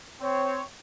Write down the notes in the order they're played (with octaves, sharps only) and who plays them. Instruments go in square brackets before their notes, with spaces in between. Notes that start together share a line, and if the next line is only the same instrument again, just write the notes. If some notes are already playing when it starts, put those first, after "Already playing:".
[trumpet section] C4 C#5